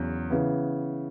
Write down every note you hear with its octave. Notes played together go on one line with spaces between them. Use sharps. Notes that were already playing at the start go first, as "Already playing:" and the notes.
Already playing: E2 C#3 F#3
C#3 E3 B3